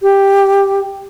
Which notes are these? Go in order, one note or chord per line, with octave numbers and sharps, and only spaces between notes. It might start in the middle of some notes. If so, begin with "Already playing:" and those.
G4